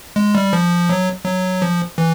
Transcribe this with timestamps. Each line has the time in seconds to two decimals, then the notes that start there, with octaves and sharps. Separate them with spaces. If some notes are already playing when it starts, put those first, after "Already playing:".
0.16 G#3
0.35 G3
0.53 F3
0.89 F#3
1.25 F#3
1.62 F3
1.98 E3